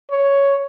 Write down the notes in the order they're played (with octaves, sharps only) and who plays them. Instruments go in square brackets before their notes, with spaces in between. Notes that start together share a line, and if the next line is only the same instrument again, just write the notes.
[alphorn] C#5